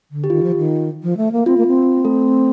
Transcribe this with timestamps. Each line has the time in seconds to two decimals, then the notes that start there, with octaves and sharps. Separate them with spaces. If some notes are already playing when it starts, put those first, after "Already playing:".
0.11 D3
0.24 G4
0.30 D#3 F4
0.43 F3
0.56 D#3
1.03 F3
1.17 A3
1.32 A#3
1.46 C4 F4
1.57 A#3
1.67 C4
2.05 A3 A4